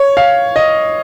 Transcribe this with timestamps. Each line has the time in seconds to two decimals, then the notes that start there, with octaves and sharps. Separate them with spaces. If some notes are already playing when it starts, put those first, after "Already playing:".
Already playing: C#5
0.17 F5
0.56 D#5